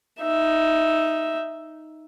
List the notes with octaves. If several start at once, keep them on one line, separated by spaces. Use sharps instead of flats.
D#4 E5